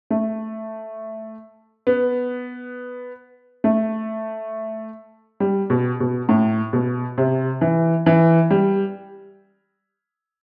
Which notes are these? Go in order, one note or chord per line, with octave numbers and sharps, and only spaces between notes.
A3
B3
A3
G3
B2
B2
A2
B2
C3
E3
E3
G3